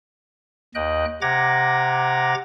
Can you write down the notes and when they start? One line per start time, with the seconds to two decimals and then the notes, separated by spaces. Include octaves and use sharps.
0.75 D#2 D#5 G5 F#6
1.22 C3 F#5 A#5 D6 G#6 A#6